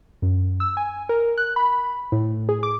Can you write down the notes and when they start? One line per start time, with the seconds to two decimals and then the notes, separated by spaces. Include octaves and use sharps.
0.22 F#2
0.60 E6
0.77 G#5
1.09 A#4
1.38 F#6
1.56 B5
2.12 A2
2.49 G#4
2.63 D6